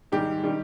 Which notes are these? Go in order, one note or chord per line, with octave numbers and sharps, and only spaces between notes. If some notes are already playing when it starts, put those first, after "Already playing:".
G#2 D#3 G3 G4
D#3 G3